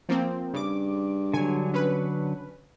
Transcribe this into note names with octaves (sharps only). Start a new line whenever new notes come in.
F3 A#3 C4
G2 C#3 D6
D3 F#3 G#5
C#4 B4